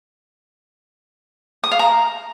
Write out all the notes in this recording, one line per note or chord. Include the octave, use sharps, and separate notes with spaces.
D#6
F5
A#5